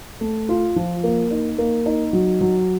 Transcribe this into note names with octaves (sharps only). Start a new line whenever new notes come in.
A3
F4
F3
A#3
D#4
A#3
D#4
F#3
F#3